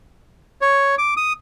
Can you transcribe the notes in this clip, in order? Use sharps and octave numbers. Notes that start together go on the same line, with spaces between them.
C#5
D6
D#6